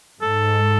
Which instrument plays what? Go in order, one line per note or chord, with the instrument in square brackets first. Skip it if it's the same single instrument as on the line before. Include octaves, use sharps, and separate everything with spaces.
[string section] G#2 [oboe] A4